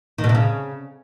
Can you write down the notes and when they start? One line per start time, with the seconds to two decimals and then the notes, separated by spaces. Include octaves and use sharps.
0.18 D#3
0.24 B2
0.29 C3
0.35 C#3